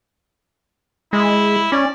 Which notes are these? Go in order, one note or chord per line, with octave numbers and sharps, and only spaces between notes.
G#3 E4
C#4 D5